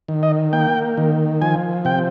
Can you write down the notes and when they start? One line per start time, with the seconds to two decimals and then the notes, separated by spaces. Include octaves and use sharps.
0.08 D#3
0.23 D#5
0.53 A#3 G5
0.98 D#3
1.42 F3 G#5
1.85 C3 G5